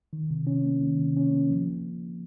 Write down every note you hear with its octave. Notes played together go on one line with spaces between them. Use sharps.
D#3
C3
C#4
A#3
D#3
C3
C#4
A#3
F3